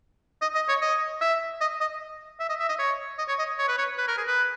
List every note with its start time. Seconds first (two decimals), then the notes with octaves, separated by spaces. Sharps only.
0.42 D#5
0.55 D#5
0.69 C#5
0.82 D#5
1.21 E5
1.61 D#5
1.81 D#5
2.40 E5
2.49 D#5
2.60 E5
2.69 D#5
2.79 C#5
3.18 D#5
3.28 C#5
3.39 D#5
3.58 C#5
3.68 B4
3.78 C#5
3.98 B4
4.08 A#4
4.18 G#4
4.27 B4